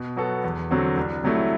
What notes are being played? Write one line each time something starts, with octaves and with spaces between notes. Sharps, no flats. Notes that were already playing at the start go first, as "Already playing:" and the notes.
Already playing: B2
F#3 B3 F#4 A4
E2
D3 F#3 C4 F#4
C2
C3 F#3 A3 E4